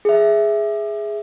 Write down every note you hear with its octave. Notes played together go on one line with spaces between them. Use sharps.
G#4 E5